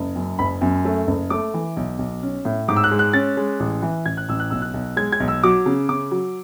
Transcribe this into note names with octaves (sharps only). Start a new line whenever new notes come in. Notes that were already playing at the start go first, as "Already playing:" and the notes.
Already playing: F#1
F#2
F#1 B5
F#2
A3
F#1
A3 D6
E3
B1
B1
C#4
A2
G#2 D6
E6
F#6
G#3
F#6
C#4 A6
G#3
A1
E3
A1 G#6
F#6
A1 E6
F#6
B1 E6
F#6
B1
G#3 G#6
G#6
B1
E6
F#3 D6
C#3
C#3 D6
F#3